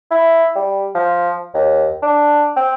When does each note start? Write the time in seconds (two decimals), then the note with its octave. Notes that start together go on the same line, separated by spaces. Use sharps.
0.11 E4
0.55 G3
0.95 F3
1.54 D#2
2.03 D4
2.57 C4